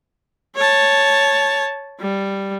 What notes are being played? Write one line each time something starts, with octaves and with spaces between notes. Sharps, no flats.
C#5 A5
G3